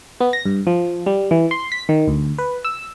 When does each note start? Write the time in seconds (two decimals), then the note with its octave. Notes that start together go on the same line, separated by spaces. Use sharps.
0.21 B3
0.33 A#6
0.46 G2
0.67 F3
1.06 G3
1.31 E3
1.51 C6
1.72 B6
1.89 D#3
2.08 D2
2.38 B4
2.65 E6